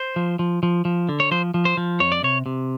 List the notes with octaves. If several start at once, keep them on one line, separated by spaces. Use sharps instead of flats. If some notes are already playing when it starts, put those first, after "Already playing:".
Already playing: C5
F3
F3
F3
F3
D3
C#5
F3 C5
F3
C5
F3
F2 C#5
D5
C3 C#5
C3